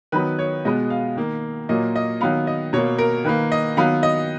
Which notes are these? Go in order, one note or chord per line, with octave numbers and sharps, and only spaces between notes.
D#3 F#3 B3 B4
C#5
B2 G#3 B3 D#5
F5
D#3 A#3
A#2 F#3 A#3 D#5
D#5
D#3 F#3 B3 F5
D#5
B2 A#3 C#5
A#4
D#3 A#3 B4
D#5
D#3 F#3 B3 F5
D#5